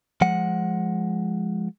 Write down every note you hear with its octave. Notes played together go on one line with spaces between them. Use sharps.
F3 G#3 F#5